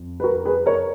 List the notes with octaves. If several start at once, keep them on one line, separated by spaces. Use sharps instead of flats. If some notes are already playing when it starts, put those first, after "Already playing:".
Already playing: F2 F3
B4
F#4 A#4
G#4 B4
A#4 C#5